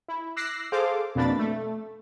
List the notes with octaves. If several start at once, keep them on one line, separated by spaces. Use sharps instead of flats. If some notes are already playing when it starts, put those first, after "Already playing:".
E4
D6 E6 F#6 A#6 C7
G#4 A4 C5 F5 D6
F2 B2 A#3 D4 B5 A6
A3